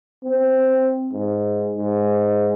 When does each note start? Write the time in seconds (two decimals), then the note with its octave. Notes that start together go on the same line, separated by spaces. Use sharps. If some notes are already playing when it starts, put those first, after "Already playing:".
0.24 C4
1.12 G#2
1.77 G#2